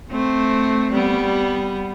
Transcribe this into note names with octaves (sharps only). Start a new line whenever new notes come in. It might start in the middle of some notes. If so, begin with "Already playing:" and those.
A3 C4
G3 B3